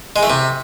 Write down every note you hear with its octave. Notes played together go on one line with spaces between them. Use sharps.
G#3
A3
C3